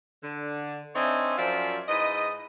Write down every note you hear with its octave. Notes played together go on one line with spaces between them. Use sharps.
D3
C4 D4 D#4 C#5 E5 G#5
F#2 F3 F4 C5 D5 E5
G#2 E4 B4 D#5